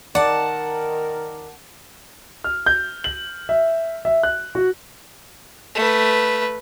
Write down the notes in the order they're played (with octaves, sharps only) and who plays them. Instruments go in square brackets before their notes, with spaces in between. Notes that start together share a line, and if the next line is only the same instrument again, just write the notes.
[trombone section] D#3 A#4 [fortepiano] D5 [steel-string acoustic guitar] F#5 A5
[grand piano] F6
G6
F#7
E5
E5
F#6
F#4
[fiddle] A3 B4